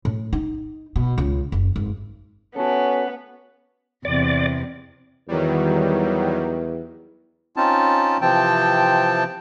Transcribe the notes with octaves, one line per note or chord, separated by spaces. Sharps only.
A2
D#4
B2
C#2
F#1
G#1
B3 C#4 F#4 A4
E2 C3 D5
E2 D#3 F#3 G3
C4 C#4 D#4 F4 A5
C3 E3 F3 C4 G5 A5